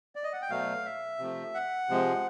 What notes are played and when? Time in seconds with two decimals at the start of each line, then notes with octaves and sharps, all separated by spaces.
0.15 D5
0.24 D#5
0.33 F#5
0.42 G5
0.50 B2 F#3 A3 F5
0.85 E5
1.19 C3 F3 A3
1.54 F#5
1.89 C3 F3 G#3